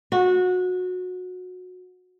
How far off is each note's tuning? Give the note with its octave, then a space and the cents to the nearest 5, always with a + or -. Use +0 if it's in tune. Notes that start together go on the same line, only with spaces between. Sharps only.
F#4 -20